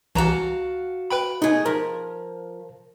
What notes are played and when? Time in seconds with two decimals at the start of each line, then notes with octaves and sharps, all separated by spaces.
0.15 C2 E3 F#4 F5 A5 A#5
1.10 B4 G5 B5
1.42 A3 D#4 G#4
1.66 F3 A#4